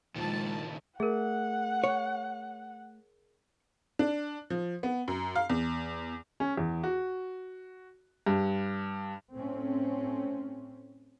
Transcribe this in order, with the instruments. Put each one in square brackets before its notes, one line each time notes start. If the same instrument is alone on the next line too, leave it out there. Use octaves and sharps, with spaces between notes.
[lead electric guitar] C#2 D#3 [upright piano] A#2 F3 [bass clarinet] G#3 [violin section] A5 A6
[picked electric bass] A3 [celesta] G#4 A#4 [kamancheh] F#5
[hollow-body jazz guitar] C#5
[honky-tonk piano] D4
F3
B3
F#2
F5
E2
[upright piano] C#4
E2
F#4
G2
[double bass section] A2 A3 C4 C#4